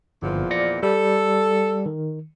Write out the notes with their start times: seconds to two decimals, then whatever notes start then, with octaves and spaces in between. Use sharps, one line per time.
0.23 G1 E2 A#2 F3
0.51 D5 A#6 C#7
0.83 G3 A4
1.86 D#3